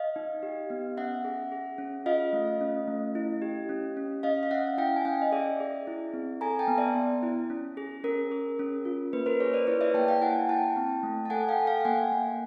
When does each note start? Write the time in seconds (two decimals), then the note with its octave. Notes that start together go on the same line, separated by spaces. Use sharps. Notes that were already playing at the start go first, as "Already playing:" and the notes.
Already playing: D#5 F5
0.16 D#4
0.43 G4
0.70 B3
0.97 C#4 E5 F#5
1.25 G#4
1.52 G#4
1.78 C#4
2.06 F4 D#5 F5
2.33 A3
2.61 C#4
2.88 A3
3.15 E4
3.42 G4
3.69 C#4
3.97 C#4
4.23 C#4 D#5 F5
4.43 F5
4.51 C#4 E5 F#5
4.78 E4 F5 G5
4.96 G#5
5.05 C#4 F5 G5
5.22 D#5
5.32 G#4 D5 E5
5.60 G#4
5.87 E4
6.14 C4
6.41 A4 G#5 A#5
6.59 G5 A5
6.68 B3
6.78 D5 E5
6.95 B3
7.23 E4
7.50 C#4
7.77 G#4
8.04 C#4 A#4
8.32 G#4
8.59 C#4
8.85 F4
9.13 A#3 B4
9.26 A#4 C5
9.40 G#4 B4 C#5
9.53 C5 D5
9.67 E4 B4 C#5
9.81 D5 E5
9.94 A#3 G5 A5
10.08 F5 G5
10.21 E4 F#5 G#5
10.49 E4 G5 A5
10.76 C4
11.03 A3
11.25 A5
11.30 A4 F#5 G#5
11.49 F5 G5
11.58 A4
11.66 F5 G5
11.80 G5
11.85 A#3 F#5 G#5
12.12 A#3